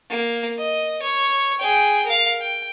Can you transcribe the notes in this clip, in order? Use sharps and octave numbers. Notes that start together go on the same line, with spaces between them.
A#3
D#5
C#5
G#4 G5
A#4 F5
G5